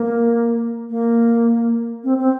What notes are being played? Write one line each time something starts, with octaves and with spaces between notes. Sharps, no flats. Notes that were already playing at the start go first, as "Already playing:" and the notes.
Already playing: A#3
A#3
C4
C4